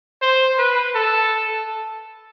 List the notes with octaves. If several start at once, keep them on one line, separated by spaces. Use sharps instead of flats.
C5
B4
A4